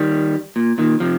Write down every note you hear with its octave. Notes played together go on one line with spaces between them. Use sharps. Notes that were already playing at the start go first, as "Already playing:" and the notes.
Already playing: D#3 G3
A#2
A#2 D#3
C3 F3